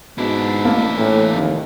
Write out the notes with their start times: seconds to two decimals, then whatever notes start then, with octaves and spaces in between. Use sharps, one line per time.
0.18 G#2 B2 D4 E4
0.65 A1 A#3
0.97 A2 E3
1.32 F1 D#2